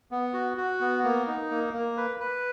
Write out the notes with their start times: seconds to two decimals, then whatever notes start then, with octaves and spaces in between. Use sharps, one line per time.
0.11 B3
0.34 F#4
0.57 F#4
0.81 B3
1.04 A#3
1.27 D#4
1.50 A#3
1.74 A#3
1.97 B4
2.20 B4